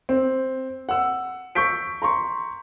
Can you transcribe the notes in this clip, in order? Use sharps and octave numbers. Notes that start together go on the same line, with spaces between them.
C4
F#5 E6
C#6 E6 G6 B6 D7
A#5 C6 C#6